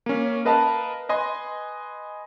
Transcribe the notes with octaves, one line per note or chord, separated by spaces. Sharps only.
A#3 C#4
A#4 B4 D#5 F5 A5
B4 D#5 G#5 C6